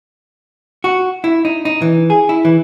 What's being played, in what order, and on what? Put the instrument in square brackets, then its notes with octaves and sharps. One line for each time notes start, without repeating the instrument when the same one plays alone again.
[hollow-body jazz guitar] F#4
E4
D#4
D#4
E3
G#4
E4
E3